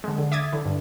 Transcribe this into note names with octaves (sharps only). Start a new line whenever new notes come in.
D3 G#3
D3
E5 D6 D#6 G#6 A6
D3 E4
G2